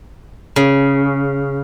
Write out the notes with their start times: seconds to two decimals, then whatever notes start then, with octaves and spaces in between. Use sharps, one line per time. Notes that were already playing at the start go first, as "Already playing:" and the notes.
0.56 C#3